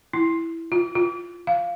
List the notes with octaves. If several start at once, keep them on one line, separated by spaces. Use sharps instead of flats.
E4
F4
F4
F5